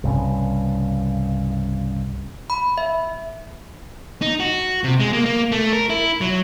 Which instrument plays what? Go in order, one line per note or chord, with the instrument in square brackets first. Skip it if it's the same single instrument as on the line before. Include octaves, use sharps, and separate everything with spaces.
[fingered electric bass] C2 G2 C#3
[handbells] B5
E5
[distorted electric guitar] D#4
F#4
C3
G#3
A#3
A#3
A3
A#4
E4
F#3